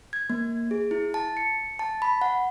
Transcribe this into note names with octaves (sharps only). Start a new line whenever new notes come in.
G#6
A#3
G#4
E4
A5
C#7
A5
B5
F#5